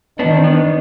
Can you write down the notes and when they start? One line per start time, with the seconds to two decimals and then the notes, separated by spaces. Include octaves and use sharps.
0.19 D#3 B3 D4
0.37 C4
0.44 B3 D4